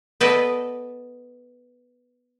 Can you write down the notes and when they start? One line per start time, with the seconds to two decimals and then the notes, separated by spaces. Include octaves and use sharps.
0.21 B3 A4 B4 D5 D#5